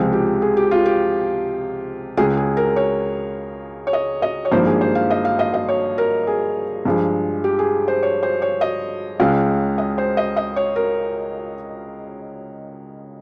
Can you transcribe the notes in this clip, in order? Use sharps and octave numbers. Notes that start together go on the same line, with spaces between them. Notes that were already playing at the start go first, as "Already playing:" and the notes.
Already playing: C#2 C3 F3 G#3
G4
G#4
G4
F4
G4
C#2 C#3 G#3 G#4
G#4
A#4
C#5
C#5
D#5
D#5
C#5
G#1 G2 F3 A#3 C5
G#4
C5
F5
D#5
F5
D#5
D#5
C#5
A#4
G#4
G2 F3 G#3
G4
G#4
C5
C#5
C5
C#5
D#5
C#2 C#3 G#3 F5
D#5
C5
D#5
D#5
C#5
A#4